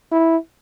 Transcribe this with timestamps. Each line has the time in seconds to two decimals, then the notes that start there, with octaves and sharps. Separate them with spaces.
0.12 E4